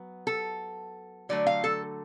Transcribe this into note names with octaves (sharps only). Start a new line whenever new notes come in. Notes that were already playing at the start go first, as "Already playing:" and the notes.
Already playing: F#3 B3
A4
D3 F#3 A3 D5
F5
A4